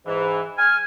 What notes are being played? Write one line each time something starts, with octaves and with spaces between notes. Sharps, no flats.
G#2 E3
G#5 F6